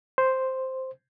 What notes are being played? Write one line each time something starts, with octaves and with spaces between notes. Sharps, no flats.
C5